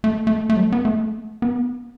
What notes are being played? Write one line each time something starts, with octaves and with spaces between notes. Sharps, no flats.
A3
A3
A3
F#3
A3
B3
A3
B3